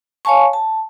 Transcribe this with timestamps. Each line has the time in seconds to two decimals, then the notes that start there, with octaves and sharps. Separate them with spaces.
0.25 C#5 F5 G#5 A5 C#6
0.53 A5